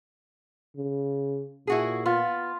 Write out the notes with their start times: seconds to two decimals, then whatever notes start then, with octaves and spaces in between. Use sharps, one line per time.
0.77 C#3
1.67 A#2 E4 F#4 G#4
2.06 B3 F4